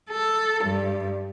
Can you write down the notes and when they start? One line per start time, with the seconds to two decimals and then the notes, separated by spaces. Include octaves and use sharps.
0.11 A4
0.64 G2